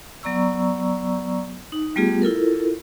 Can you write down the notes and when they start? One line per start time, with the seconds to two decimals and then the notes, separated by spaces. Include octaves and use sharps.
0.23 F#3 B3 D5 A#5 C#6 E6
1.72 D#4
1.96 G3 A3 B3 F4 G4 G#4
2.22 E4 F4 A4 A#4